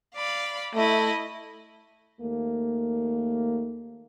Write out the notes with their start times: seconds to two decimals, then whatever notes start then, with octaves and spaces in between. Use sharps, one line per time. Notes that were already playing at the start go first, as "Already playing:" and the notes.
0.15 D5 F5 B5
0.75 A3 E4 D#5
2.21 D#2 A3 A#3